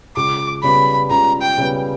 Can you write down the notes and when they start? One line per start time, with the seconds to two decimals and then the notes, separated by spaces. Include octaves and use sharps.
0.16 C#2 D6
0.63 C#3 G3 B3 B5
1.10 C#2 A#5
1.42 G5
1.58 C#3 G3 B3